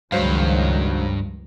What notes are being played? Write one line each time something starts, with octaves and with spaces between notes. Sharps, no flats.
C#2 G2 D#3 F3 F#3 G#3 C5 F5